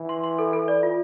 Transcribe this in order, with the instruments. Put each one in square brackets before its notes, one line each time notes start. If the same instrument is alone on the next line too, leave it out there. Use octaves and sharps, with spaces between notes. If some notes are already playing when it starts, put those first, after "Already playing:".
Already playing: [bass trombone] E3
[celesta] C6
C6
A4
A4
D5
F4